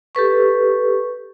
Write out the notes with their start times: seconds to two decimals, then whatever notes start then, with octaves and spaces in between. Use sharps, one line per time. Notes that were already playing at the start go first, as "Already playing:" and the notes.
0.15 G4 A4 B4 C#6